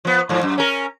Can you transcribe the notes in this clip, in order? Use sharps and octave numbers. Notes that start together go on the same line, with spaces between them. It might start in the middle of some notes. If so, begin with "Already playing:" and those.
F3 B3
G#2 F3
F#2
C#4 A#4